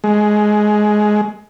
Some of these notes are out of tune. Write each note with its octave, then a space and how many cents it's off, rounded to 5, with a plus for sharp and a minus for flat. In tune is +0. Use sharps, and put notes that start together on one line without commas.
G#3 +15